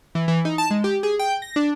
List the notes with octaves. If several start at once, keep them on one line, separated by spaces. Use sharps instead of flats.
E3
E3
D#4
A5
G#3
G4
G#4
G5
A#6
D4